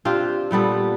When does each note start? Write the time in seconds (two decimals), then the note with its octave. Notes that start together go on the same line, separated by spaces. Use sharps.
0.05 C4 D4 F4 G4
0.51 A#2 G3 B3 A4